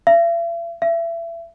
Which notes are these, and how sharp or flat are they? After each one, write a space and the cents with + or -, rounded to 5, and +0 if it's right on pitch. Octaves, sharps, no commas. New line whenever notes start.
E5 +45
E5 +30